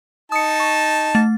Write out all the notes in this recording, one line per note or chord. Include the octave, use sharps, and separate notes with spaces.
D#4 A5 D#6 C#7
C#6
A3 A6